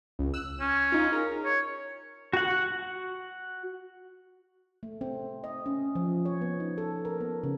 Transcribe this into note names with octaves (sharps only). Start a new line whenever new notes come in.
C#2
E6 F#6
C#4
D#4 F4
G#4 A#4 A#5
C#5
F#4 F#5
A3
C4
D#5
C#4
F3
C#5
B3
D#4
A4
A#4
B3
C#3